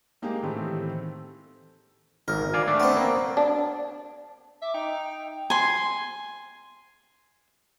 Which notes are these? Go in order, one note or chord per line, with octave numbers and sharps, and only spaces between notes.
G#3 A#3 D#4 G4 G#4 G5
A2 D#3 E3 A3 C4 G4
G#1 A#4
D5 F5 G#5
A3 D4
B3 C4
A#3
D4
E5 D6
D#4 G5
G#5 C6